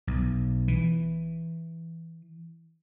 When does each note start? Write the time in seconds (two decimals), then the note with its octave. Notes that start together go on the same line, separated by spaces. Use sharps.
0.07 B1
0.68 E3